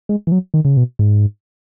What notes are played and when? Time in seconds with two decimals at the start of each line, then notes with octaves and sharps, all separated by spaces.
0.09 G#3
0.27 E3
0.32 F#3
0.54 D#3
0.65 C#3
0.77 B2
0.99 G#2